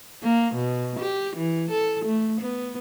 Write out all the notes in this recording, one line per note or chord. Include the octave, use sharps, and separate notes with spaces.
A#3
B2
G4
E3
A4
A3
B3